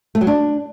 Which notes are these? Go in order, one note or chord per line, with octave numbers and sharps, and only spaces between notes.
A3
F#3
D4